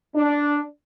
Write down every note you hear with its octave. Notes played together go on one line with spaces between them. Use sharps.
D4